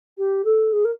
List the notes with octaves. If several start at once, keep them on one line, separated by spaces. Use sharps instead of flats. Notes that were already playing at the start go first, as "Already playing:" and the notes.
G4
A4
G#4
A#4